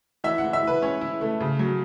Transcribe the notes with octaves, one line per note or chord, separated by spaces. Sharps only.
E3 E5
F#5
E3
E5
E3 B4
C#4 C#5
E4
A3
C#3
F#3